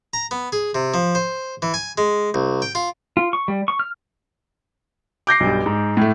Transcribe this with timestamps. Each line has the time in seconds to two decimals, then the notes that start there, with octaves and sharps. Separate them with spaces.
0.13 A#5
0.31 B3
0.52 G#4
0.75 C3
0.94 F3
1.15 C5
1.62 E3
1.74 G#5
1.98 G#3
2.34 C2
2.62 G5
2.75 F4
3.17 F4
3.33 C#6
3.48 G3
3.68 C#6
3.79 F6
5.27 D6 G6 A#6 C7
5.40 B1 G2
5.66 G#2
5.97 A2 A3